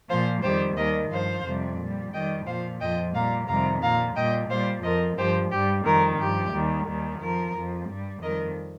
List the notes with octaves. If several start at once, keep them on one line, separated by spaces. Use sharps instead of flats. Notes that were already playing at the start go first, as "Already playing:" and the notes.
A#2 F3 C5 F5
F2 D#3 G3 G4 C5
D#2 D#3 G3 A#4 D#5
G2 F3 C5 F5
F2 C3 G3
A#2 G3
F2 D#3 G3 D#5 G5
A#2 F3 C5 F5
F2 F3 D#5 G5
A#2 G3 F5 A#5
F2 C3 D#3 G3 F5 A#5
A#2 F3 F5 A#5
A#2 G3 D#5 G5
A#2 G3 C5 F5
F2 F3 A#4 D#5
G2 F3 G4 C5
G2 G3 G4
F2 D#3 G3 A#4
G2 F3 G4
D#2 D#3 G3
D#2 D#3 G3
F2 F3 A#4
F2 F3
G2 G3
F2 D#3 G3 A#4 D#5